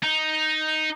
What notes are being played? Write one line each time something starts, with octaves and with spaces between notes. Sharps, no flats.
D#4